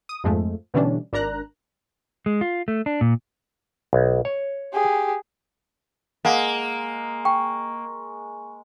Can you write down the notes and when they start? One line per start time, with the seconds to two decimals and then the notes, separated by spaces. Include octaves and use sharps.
0.09 D#6
0.24 F2 G#2 F3 G#3 A3
0.74 B2 D3 E3 G3 C#4 D4
1.13 G#1 D4 A#4 A#5 F#6
2.26 G#3
2.41 F4
2.68 A3
2.86 D4
3.01 A#2
3.93 B1
4.25 C#5
4.73 G4 G#4
6.25 G#3 A#3 F5 F#5
7.25 G5 C#6